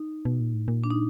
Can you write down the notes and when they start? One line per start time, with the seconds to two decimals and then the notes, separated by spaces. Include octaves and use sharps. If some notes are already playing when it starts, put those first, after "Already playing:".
Already playing: D#4
0.25 B2
0.40 A#2
0.54 A2
0.68 A#2
0.84 D4
0.91 D#4